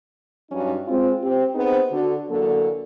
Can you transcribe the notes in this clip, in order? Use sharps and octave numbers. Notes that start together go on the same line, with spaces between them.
G2 F#3 C#4 D#4
G#3 C4 F4
C4 G4
B3 C4 D#4 G#4 B4 C5
D3 F#4
E2 D3 F#3 A#3 A4